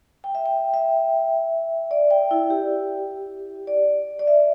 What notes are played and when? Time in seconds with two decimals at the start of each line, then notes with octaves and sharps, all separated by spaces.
0.24 G5
0.35 E5
0.46 G5
0.74 E5
1.91 D5
2.11 G5
2.31 E4
2.50 G4
3.67 D5
4.19 D5
4.27 E5